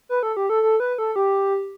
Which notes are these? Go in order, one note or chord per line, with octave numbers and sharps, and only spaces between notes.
B4
A4
G4
A4
A4
B4
A4
G4